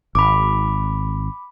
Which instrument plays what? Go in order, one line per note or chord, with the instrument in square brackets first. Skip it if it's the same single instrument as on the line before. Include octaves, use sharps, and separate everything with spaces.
[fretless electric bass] G#1 [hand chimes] B5 D6